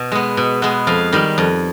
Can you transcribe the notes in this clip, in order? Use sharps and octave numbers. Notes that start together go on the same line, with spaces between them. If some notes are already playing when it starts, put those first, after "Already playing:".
Already playing: B2
G#3 B3
B2
G#3 B3
F2 F5
D#3 G3
F2